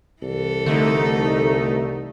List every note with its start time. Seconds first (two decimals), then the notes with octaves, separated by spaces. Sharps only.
0.22 C2 E3 A4
0.66 D3 A3 D#4